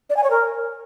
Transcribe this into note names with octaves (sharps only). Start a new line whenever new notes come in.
D5
G#5
C#5
A#4